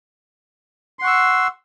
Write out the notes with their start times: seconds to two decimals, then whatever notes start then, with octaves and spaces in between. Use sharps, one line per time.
0.99 C6
1.02 F#5
1.04 C#6
1.07 E6